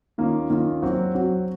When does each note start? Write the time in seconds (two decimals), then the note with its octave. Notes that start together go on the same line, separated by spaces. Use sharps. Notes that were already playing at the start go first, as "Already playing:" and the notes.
0.18 D#3 A#3 C#4 F4
0.50 D#3 A#3 C#4 F4
0.82 F#3 C4 F#4
1.15 F#3 C4 F#4